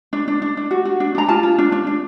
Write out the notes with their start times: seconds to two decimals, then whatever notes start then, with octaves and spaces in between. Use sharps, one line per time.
0.13 D4
0.28 D4
0.42 D4
0.57 D4
0.71 F#4
0.85 F#4
1.00 D4
1.15 D4 A#5
1.29 F4 A5
1.43 F4
1.58 D4
1.72 D4
1.87 D4